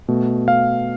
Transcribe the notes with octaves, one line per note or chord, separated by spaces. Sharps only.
B2 A3
F5